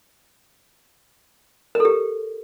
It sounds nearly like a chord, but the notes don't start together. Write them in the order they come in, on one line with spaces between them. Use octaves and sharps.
A#4 A4 G4